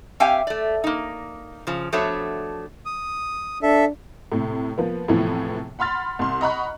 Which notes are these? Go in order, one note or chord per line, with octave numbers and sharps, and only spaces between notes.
C4 G4 E5 F5 G5 G#5
A3 D5
A#3 D#4
C#3 F3
F3 A3 B3 D4 F#4 C#5
D#6
D4 A4 E5
A2 C3
F3 A#3 B3
E2 A2 C3 E3 F3
F#5 B5 C6 F6 A6
C2 C6
D#5 F#5 A#5 B5 C#6 F#6